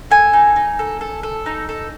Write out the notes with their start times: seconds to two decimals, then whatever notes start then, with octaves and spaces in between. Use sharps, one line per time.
0.11 A4 G#5
0.33 D#4
0.56 D#4
0.79 A4
1.01 A4
1.23 A4
1.46 D#4
1.69 A4